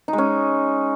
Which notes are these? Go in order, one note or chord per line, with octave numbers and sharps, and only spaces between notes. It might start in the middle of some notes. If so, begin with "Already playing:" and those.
D#4
G#3
C#4